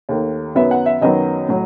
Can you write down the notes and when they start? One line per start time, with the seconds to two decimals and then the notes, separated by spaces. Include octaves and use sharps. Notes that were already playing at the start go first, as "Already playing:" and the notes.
0.09 D#2 D#3 A3
0.55 F#2 D#3 F#3 B3 E5
0.71 F#5
0.86 E5
1.01 F#2 D#3 F#3 B3 D#5
1.49 A2 F#3